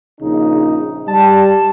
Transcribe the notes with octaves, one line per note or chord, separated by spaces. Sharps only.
A#1 C#3 D#4
G3 A5